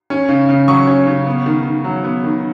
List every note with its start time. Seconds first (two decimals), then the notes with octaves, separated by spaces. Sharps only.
0.10 C#4
0.29 C#3
0.49 C#3
0.68 F#3 C#6
0.87 C#4
1.07 C#3
1.27 B3
1.46 D#3
1.65 D#3
1.84 F#3
2.04 B3
2.24 D#3